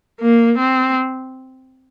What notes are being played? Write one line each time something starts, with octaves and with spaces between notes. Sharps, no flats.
A#3
C4